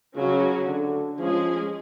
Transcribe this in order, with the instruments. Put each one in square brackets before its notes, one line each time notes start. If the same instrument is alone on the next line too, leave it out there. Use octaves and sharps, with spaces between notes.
[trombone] C#3 [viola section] F#3 C#4 F#4
[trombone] D3
[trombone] F3 [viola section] G#3 C#4 G#4